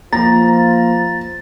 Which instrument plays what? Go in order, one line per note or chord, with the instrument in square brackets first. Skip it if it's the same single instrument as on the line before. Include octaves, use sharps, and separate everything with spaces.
[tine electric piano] F3 A#3 [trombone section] F4 C5 [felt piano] A#5 [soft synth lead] A6